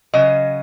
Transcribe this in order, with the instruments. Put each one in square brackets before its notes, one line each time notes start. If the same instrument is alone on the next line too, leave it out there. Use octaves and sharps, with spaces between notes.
[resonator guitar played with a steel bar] C#3 F#3 D#5